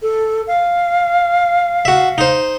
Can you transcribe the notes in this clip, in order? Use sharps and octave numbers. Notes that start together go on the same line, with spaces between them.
A4
F5
F#4 E5
D#4 C5